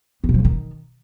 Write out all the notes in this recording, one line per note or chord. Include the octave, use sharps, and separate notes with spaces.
B3
C3
F3
C#3
D#3